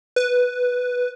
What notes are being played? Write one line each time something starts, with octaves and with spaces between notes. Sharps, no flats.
B4